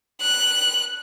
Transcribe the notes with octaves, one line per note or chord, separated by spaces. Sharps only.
F#6